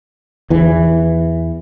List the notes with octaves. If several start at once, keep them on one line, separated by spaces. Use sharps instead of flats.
E2 E3